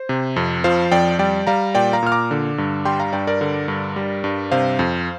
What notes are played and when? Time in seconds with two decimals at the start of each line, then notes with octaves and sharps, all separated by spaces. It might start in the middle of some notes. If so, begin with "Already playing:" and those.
Already playing: C5
0.09 C3
0.36 F2
0.64 F3 C5 F5
0.92 F2 D5 G5
1.19 G3 D5 G5
1.47 G3 F5 A#5
1.75 A#2 D5 G5
1.93 F5 A#5
2.03 A#2 F6
2.12 A#5 D6
2.31 D3
2.58 G2
2.85 G3 G5 C6
3.00 F5 A#5
3.13 G2 D5 G5
3.27 A#4 D5
3.41 D3
3.68 G2
3.96 G3
4.24 G2
4.52 C3 C5 F5
4.79 F2